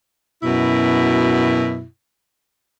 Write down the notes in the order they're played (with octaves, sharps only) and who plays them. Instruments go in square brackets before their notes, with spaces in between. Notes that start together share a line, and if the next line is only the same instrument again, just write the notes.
[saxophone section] F#2 B2 E4